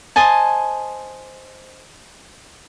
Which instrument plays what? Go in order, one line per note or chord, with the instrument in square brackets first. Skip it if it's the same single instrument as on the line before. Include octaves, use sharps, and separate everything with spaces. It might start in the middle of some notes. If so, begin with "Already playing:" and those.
[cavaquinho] C5 D#5 G#5 A5